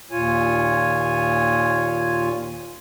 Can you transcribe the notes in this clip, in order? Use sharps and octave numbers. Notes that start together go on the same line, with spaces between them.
D#2 A#2 F4 C#5 G#5